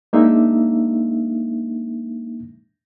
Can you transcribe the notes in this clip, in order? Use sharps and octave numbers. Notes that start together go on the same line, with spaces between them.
G#3 A#3 D4 D#4 E5